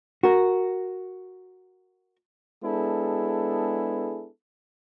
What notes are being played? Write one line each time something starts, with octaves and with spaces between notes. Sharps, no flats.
F#4 A#4
G#3 B3 D4 E4 G#4 A4